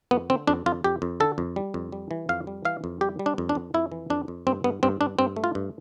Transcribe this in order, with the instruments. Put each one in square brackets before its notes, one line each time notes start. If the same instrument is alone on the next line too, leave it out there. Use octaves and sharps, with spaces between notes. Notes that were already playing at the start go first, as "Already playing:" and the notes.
[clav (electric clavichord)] F2 B3
D3 C4
F2 D4
F2 F4
F2 G4
F2
D3 A4
F2
G3
F2
G3
E3
F2 F5
G3
E3 F5
F2
G3 G4
G3
D4
F2
D4
F2
F2 E4
E3
F2 D4
F2
G2 C4
G2 B3
G2 C4
G2 D4
G2 C4
A3
F4
G2